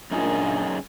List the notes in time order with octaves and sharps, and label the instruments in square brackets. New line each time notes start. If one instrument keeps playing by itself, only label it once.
[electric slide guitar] F#2 D#4 G#4 [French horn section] A#2 D4